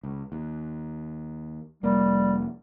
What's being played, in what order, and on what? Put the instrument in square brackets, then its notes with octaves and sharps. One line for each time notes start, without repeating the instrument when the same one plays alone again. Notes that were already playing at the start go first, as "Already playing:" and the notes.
[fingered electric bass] C#2
D#2
[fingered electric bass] F1 A#3 [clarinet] G3